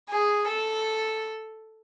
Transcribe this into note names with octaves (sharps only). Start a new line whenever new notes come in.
G#4
A4